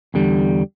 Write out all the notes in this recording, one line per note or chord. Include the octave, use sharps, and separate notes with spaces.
E2 D3 G3